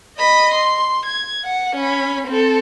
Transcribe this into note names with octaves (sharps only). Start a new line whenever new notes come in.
D#5 B5
C6
G#6
F#5
C#4 B5
C4 A4